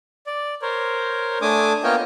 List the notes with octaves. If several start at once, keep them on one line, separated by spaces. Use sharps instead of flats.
D5
A#4 C5 C#5
A3 D4 G#5 D6 D#6
A#3 B3 F4 C#5 D#5 G5